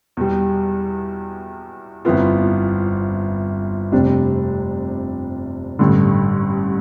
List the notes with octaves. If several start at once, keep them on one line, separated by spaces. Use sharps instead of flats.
E2 B2 G3
G1 F2 E3 B3 F4
F1 F2 C3 G3 D4
A1 G2 D3